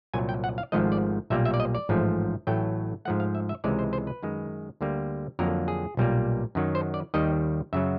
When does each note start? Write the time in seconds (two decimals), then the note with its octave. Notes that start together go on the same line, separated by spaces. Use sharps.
0.14 C2 A#2 F#3 G#5
0.29 G5
0.44 F#5
0.58 F5
0.72 G#1 G#2 F3 A3 D#5
0.92 D5
1.30 B1 A#2 G3 A#3 E5
1.45 E5
1.54 D5
1.60 D#5
1.75 D5
1.89 A1 G#2 F3 A3
2.47 A1 A2 F#3 A3 G5
3.05 G#2 F3 A3 F#5
3.20 F5
3.35 E5
3.49 E5
3.64 C#2 C3 E3 G#3 D5
3.79 C5
3.93 C5
4.07 B4
4.23 F#2 D#3 G#3
4.81 D2 D3 G3 A#3
5.39 F2 D3 F#3 A#3 A#4
5.68 G#4
5.97 B1 A#2 G3 A#3
6.55 F#2 D#3 F#3
6.75 C5
6.94 D5
7.14 D#2 D#3 G3 D#5
7.73 F#2 C#3 F#3 E5